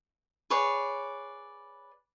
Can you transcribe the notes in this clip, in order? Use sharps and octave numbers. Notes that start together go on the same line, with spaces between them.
G#4 B4 C#5 D5